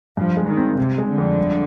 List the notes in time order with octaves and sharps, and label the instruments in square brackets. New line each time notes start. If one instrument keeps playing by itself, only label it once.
[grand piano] G2 [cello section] F3
[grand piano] G#3
[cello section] D#3
[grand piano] C4
[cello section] C3 [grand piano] C4
[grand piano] G#3
[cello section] D3
[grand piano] F2
G1